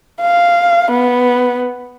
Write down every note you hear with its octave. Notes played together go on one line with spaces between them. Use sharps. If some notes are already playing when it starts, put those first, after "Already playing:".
F5
B3